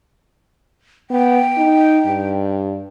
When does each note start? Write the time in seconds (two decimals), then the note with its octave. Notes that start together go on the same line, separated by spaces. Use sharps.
1.10 B3 G5
1.57 D#4
2.07 G2